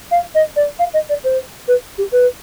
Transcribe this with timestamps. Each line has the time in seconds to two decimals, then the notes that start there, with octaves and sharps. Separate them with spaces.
0.11 F5
0.34 D#5
0.55 D5
0.79 F5
0.93 D#5
1.09 D5
1.24 C5
1.67 B4
1.98 G4
2.12 B4